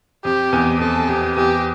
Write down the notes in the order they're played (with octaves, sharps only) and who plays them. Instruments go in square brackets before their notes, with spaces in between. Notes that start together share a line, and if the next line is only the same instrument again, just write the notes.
[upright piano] F2 [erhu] G4
[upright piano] E2
[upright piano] F2 [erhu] A4
[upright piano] F2 [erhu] G4
[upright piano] E2 [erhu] G4